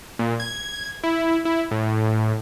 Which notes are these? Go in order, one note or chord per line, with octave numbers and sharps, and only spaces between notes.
A#2
G#6
E4
E4
A2